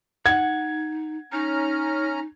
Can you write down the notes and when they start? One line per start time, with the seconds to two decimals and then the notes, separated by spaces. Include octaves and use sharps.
0.26 D#4 F#5 G#6
1.32 C#4 D#4 A#5 F6